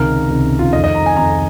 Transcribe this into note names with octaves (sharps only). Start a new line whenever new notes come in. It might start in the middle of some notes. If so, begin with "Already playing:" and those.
Already playing: C#2 C3 D#3 A#4
C#2 C3 D#3
F4
F2 D#3 D#5
D#5
A#5
G#5
F2 D#3 A#5